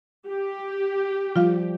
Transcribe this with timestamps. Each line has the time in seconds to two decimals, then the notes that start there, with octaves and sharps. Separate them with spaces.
0.27 G4
1.36 F3 G3 F4 F5